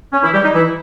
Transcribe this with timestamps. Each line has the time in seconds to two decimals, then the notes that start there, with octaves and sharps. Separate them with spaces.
0.13 C#4
0.23 E3 E4
0.34 G3 G4
0.44 D#4
0.55 E3 E4